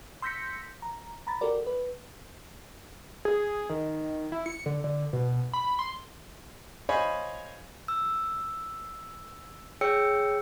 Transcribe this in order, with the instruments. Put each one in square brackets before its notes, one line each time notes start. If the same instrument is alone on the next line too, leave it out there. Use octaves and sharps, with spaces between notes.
[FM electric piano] C6 E6 G6 A#6 B6 C#7
A#5
A#5 B5 A6
F#4 G4 A4 A#4 D5
B4
[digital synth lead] G#4
D#3
E4
C#7
D3
D3
B2
B5
C6
[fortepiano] C5 C#5 D#5 F5 G#5 B5
[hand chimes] E6
G#4 C#5 G5 E6 C#7